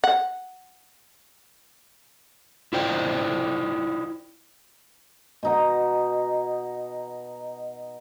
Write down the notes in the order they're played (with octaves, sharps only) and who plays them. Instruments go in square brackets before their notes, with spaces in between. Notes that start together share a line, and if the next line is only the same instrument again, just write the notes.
[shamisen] F#5
[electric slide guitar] E4 F4 A#4 C5 D5 G5
[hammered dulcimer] B2 D#4 F#5